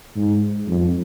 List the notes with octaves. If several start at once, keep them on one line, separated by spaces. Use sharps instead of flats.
G#2
F2